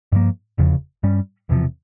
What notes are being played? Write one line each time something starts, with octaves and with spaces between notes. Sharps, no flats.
G2 F3 A#3
F1 E2 C#3 F3
G2 G3 C#4
E1 E2 C3 F3